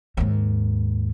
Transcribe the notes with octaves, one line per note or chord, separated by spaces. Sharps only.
D#2 G#2